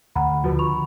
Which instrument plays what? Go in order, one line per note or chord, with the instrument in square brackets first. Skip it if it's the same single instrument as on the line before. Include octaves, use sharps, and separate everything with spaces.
[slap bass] D2 [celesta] F#5 A#5 B5
[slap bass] D3 F3 [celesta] F4 F#4 B4
[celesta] B5 C#6 F7